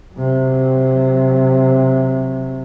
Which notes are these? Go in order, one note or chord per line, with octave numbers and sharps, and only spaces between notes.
C3 F#3